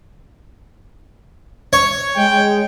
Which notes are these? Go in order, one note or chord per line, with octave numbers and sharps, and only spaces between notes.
C#5
G#3 G5